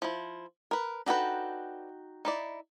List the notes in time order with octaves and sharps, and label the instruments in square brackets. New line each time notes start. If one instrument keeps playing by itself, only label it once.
[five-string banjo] F3 E4
A#4 B4
[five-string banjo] D4 A4 B4 [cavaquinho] D#4 F#4 G5
[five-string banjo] D#4 E4 D5